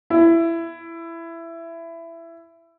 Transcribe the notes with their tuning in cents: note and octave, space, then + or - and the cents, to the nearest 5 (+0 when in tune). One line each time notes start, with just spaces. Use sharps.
E4 +15